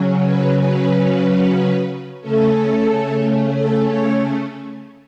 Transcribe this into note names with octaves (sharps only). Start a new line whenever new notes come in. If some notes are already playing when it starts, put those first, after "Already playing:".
Already playing: C#3 F#3 C#4
B4
B4
C#3 A3 C#4 A4
A4
C#5